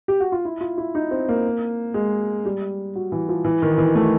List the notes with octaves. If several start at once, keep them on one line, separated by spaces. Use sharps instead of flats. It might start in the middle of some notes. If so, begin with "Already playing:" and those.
G4
F#4
F4
E4
F4
E4
D#4
C4
A#3
G#3
G3
F#3
E3
F3
E3
D#3
E3
A3